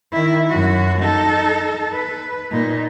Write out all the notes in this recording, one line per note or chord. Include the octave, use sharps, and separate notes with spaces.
D#3 E4
F#2 F#4
D#4 A4
B4
A#2 D#4